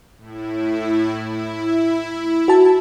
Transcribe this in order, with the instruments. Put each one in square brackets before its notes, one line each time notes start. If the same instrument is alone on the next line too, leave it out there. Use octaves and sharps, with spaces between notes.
[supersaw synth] A2 E4
E4
[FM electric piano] F#4 A5